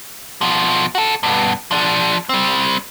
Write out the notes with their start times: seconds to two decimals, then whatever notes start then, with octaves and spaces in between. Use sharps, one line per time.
0.41 B2 F3
0.95 F#4 A4
1.23 G2 B2
1.71 F3 D4
2.29 G3 C4